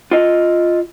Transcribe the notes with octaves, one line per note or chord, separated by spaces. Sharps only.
F4 D#5